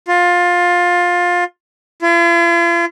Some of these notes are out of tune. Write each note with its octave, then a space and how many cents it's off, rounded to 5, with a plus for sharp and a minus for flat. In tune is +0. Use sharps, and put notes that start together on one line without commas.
F4 +20
F4 -45